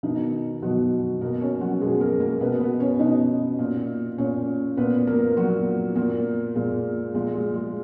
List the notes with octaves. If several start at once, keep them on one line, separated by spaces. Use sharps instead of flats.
B2 D#3 D#4
B2 F#3 F#4
B2 A#3 A#4
C#4 C#5
F#3 F#4
B2 G#3 G#4
G#4
A#3 A#4
A#3 A#4
B2 B3 B4
B3 B4
C#4 C#5
B2 D#4 D#5
A#2
A#2 C#4 C#5
A#2 B3 B4
A#3 A#4
A#2 F#3 F#4
A#2 A#3
A#2 G#3
A#2 G#3
G#3
G#3